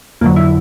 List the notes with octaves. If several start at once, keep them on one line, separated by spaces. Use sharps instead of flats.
F2 D3 F#3 A#3
E4